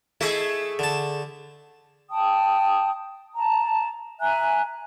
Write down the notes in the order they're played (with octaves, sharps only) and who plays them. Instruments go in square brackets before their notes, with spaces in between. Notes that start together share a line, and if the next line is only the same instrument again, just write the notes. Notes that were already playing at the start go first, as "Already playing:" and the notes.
[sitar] A3 G#4 [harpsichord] E4 D#5
[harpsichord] D3 A5
[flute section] G5 A5 D#6
A5 A#5
E5 G#5 A#5 F#6